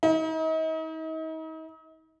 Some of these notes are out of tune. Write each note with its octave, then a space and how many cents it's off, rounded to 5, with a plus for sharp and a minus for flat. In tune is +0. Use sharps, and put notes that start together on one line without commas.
D#4 +40